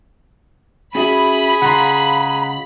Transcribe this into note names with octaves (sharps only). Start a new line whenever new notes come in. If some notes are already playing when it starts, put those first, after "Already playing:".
C#4 F#4 G#4 E5 B5
C#3 F4 F#5 A#5 C6